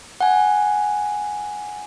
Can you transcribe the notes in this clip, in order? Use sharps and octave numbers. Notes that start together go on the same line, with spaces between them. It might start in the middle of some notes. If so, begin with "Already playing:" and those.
F#5 G#5